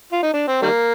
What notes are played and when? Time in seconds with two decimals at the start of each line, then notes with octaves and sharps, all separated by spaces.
0.12 F4
0.22 D#4
0.34 D4
0.47 C4
0.62 D#3 G3 A#3